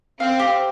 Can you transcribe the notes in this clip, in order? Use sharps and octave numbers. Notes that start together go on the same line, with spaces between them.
C4 F5
G4